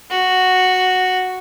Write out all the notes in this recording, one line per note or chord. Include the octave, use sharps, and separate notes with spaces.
F#4